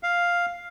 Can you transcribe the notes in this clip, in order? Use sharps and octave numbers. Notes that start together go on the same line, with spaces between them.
F5